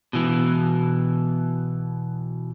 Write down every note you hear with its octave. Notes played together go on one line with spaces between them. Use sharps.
B2 E3